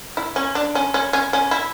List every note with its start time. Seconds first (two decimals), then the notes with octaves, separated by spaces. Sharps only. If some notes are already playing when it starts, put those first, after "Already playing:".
0.17 E4
0.36 C#4
0.55 D4
0.75 C#4
0.94 C#4
1.13 C#4
1.33 C#4
1.51 E4